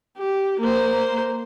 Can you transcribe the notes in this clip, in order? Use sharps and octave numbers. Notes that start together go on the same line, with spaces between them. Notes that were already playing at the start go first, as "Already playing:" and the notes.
G4
A#3 C5